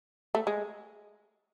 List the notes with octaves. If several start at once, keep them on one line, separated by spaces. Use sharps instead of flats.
A3
G#3